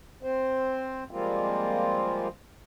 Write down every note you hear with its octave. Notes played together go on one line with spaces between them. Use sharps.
C4 C5
F3 G3 G#3 A#3 C4 F4